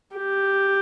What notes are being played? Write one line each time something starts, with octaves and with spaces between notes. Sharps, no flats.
G4